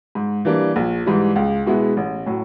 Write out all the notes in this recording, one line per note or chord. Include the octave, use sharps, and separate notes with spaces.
G#2
E3 G3 A#3 D4
A#1
G#2 E3 G3
C#2
B2 G#3 B3 E4
A1
A2 F#3